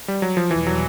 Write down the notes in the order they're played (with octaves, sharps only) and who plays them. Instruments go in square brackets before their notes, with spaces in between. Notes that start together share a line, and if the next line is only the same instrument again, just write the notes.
[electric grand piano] G3
F#3
F3
[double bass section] E2 B2 G3 [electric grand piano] E3
[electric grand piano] F#3